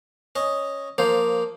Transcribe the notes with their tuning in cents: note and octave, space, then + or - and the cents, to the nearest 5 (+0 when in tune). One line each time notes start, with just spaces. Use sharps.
C#4 +0 D#5 +0
F3 +15 A#3 +0 C5 +0